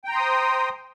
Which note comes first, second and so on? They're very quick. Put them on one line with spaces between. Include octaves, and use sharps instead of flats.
G5 A#5 C6 D#6 C5